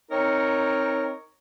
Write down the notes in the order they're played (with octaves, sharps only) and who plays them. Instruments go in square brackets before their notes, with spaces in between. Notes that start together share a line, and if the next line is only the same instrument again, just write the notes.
[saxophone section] C4 D#4 A#4 C#5